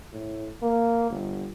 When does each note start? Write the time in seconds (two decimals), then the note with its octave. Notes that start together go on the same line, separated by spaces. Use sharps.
0.13 A2
0.62 A#3
1.10 G1